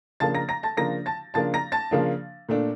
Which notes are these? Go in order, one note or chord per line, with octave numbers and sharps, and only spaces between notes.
C#3 F3 A#3 D4 A5 A6
A#5 A#6
A#5 A#6
A5 A6
C#3 F3 A#3 D4 A#5 A#6
A5 A6
C#3 F3 A#3 D4 A5 A6
A#5 A#6
A5 A6
C#3 F3 A#3 D4
A#2 A3 D4